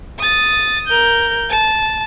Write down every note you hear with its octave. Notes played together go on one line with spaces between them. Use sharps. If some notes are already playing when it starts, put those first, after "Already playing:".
D#6 A6
A#4 G6
A5